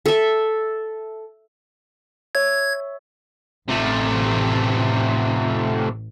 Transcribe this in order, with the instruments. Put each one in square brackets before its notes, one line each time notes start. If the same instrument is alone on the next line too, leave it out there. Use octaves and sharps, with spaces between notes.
[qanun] A4 E5
[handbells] C#5 E5 E6 [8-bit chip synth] G#6
[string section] A1 [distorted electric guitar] C3 A3